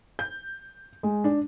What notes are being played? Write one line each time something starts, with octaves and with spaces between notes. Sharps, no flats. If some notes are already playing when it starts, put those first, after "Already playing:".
G6
G#3
D4